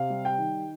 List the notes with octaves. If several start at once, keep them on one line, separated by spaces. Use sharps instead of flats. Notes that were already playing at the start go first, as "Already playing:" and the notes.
Already playing: C3 F5
G3
G5
D#3